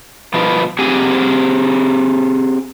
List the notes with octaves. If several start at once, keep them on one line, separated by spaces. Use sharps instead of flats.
B2 F3 B3
C4 G4 G#4 F#5 G#5